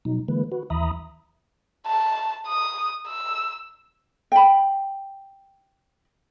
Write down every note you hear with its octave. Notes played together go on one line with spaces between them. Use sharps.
B2 F#3 D#4
D3 E3 G#3 A#3 B4
F#4 B4
D#2 E3 E5 A#5 B5 D#6
A5
D#6
E6
G5 B5